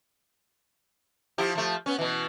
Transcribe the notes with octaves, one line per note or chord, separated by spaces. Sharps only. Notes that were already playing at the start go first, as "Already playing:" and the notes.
F3 E4 G4
F3 A3
B3 C#4
B2 E3